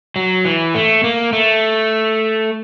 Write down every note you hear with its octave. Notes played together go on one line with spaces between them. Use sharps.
F#3
E3
A3
A#3
A3